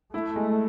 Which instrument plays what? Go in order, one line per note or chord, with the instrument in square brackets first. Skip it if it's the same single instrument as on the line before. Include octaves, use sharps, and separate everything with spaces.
[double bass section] A3 [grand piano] E4
[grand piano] G#3